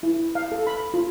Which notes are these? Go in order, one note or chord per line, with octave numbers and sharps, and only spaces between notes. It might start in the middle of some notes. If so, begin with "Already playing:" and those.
E4
F5
A4
B5
F4